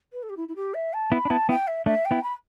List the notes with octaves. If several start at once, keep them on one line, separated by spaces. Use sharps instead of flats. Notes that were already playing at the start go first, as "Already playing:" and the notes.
B4
A4
G4
E4
E4
G4
E5
A5
B3 E4 B5
D4
B3 E4 A5
B3 E4 G5
E5
A3 D4 E5
G5
B3 E4
B5